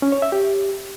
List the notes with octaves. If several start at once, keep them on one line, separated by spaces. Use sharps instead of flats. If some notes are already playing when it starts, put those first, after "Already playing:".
C#4
C#5
E5
G4